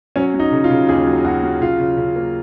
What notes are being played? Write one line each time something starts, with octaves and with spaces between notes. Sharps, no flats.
F#3 C#4
F#3
D#4
C#3
F4
C#3
D#2 G#4
F#3
D#2 F#4
F#3
C#3 F4
C#3
C#3
A#3